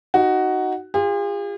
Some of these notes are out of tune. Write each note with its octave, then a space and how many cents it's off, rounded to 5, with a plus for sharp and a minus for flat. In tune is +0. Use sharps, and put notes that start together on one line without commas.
D#4 +0 F#4 +10
F4 +0 G#4 -45